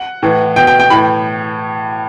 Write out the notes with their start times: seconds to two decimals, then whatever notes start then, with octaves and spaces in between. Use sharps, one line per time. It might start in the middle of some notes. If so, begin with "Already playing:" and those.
Already playing: F#5
0.23 A2 E3
0.56 B2 G5
0.67 G5
0.80 G5
0.90 A2 E3 B5